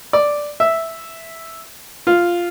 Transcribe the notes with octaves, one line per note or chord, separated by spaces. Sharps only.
D5
E5
F4